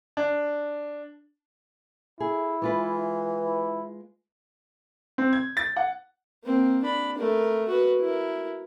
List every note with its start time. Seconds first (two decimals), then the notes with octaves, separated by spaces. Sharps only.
0.17 D4
2.20 E4 G#4
2.62 E3 G#3 F4 B4
3.44 E4
5.18 C4
5.33 G#6
5.57 A6
5.76 F#5
6.44 A#3 C4
6.84 D4 B5
7.18 A3 A#4
7.68 F#4 B4
8.01 E4 A#4